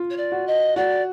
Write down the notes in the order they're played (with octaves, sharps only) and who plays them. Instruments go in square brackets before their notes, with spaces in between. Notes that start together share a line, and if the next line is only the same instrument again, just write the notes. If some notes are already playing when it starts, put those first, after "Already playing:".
Already playing: [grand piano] F4
[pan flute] C#5
D5
[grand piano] F#4
[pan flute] D#5
[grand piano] F#4 [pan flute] D5